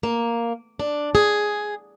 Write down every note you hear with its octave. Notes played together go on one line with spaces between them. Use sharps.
A#3
D4
G#4